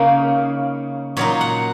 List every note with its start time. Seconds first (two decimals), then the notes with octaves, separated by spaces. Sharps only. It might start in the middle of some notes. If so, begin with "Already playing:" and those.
Already playing: C#3 A#3 D#4
1.17 A#2 F#3 D#4 C#5
1.41 F#5